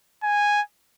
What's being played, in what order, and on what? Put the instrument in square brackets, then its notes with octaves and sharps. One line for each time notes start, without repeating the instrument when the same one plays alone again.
[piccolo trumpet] G#5